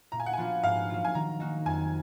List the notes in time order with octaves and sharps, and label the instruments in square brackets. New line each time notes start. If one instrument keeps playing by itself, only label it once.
[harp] A#2 [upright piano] A#5
[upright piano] G#5
F#5
G#5
[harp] F3 B3 D4 F4
[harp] G#2 [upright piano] F5
[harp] F#3 A#3 F4
[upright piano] G#5
[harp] D#3 [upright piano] A#5
[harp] A#3 D#4 F#4
[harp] F2 [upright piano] G#5